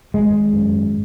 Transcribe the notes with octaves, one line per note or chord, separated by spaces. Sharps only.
G#1 G#3
F#2